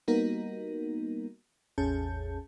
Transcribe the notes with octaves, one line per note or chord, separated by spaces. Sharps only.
G3 A#3 B3 D#4 F#4 A#4
A1 E2 C#4 G#4 A5 G6